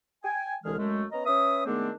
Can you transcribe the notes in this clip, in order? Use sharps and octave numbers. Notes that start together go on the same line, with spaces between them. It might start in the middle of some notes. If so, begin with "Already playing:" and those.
G5 G#5
C2 D3 E3 G#3 G#4 F6
F#2 G#3 A3
B3 C#4 D#5 A#5
C#4 B4 E5 D#6
D#3 G#3 A3 B3 C4 D4